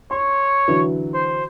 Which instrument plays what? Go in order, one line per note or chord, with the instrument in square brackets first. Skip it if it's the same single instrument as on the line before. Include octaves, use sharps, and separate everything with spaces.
[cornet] C#5 [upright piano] C6
[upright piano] D3 E3 F#3
[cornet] C5